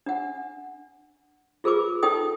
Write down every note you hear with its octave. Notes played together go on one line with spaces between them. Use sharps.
D4 F#5
F4 G#4 A#4 B4 D6
D#4 A4 G5 D#6